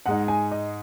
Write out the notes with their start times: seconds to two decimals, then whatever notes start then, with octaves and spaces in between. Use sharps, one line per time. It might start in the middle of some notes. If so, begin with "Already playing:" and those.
0.06 G#2 G#3 D#4 F#5
0.28 G#5
0.52 D#5